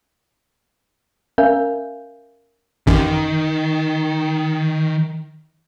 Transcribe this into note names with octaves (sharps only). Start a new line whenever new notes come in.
C#4 A#4 E5 F5 G#5 G6
A1 F#2 D#3